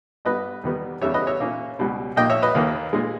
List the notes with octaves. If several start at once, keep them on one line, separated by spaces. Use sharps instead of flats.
G2 G3 B3 B4 D#5
E2 D#3 G3 B3
E2 C#3 G3 C#5 E5
B4 D#5
C#5 E5
A#2 A#3 C#4
C#2 B2 G3
A#1 A#2 A#3 D#5 G5
C#5 E5
B4 D#5
D#2 D#3 A#3
A#2 G#3